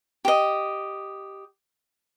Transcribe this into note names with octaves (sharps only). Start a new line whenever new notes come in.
G4 D#5